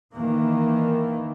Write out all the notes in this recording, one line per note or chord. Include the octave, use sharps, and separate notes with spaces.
D#3 E3 A#3